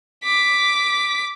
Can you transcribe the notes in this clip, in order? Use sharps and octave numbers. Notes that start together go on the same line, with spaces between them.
D6 B6